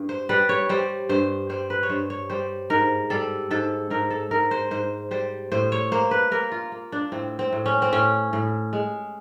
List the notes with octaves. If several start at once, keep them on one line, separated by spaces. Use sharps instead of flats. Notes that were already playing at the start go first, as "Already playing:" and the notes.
Already playing: G2
C5
G3 B4
C#5
G3 C5
G2 C5
G3 C5
B4
C#5
G2 C5
C#5
G3 C5
G#2 A#4
G3 A4
G#2 A4
G#2 A#4
A4
G#2 A#4
C5
G#2 C5
G3 C5
A2 C5
C#5
A#3 C5
B4
A#3 A#4
F4
A#3
D4
A2 C4
C4
A2
C#4
C4
A2 C#4
A2
G#3